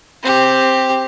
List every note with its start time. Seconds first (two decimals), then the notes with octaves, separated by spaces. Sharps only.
0.23 C4 G4